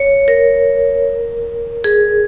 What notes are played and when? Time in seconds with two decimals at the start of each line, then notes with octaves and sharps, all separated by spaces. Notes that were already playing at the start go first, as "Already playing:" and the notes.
Already playing: C#5
0.28 A#4
1.84 G#4